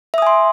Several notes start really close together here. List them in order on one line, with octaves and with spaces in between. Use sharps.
E5 D#6 G#5 C6